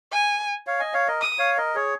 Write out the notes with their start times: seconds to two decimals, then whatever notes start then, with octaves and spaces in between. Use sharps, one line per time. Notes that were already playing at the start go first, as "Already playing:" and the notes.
0.12 G#5
0.67 C#5 F5
0.80 D#5 G#5
0.94 C#5 F5
1.08 A#4 D#5
1.21 D#6
1.39 C#5 F5
1.57 A#4 D#5
1.75 G#4 C#5